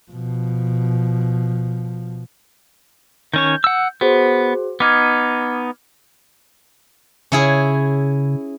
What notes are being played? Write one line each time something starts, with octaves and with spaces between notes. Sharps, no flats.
B2 F3
D#3 C#4 C#5 G6
F#5 E6
B3 F#4 G#4 C5
B3 D#4 D6 F6 G#6
C#3 C#4 E4 G#4